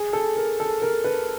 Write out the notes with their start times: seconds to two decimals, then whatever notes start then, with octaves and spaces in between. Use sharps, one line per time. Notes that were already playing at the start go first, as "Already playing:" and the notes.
Already playing: G#4
0.13 A4
0.37 A#4
0.60 A4
0.82 A#4
1.04 B4